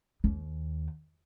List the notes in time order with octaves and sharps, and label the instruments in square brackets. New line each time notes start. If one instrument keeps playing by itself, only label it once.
[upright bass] D#2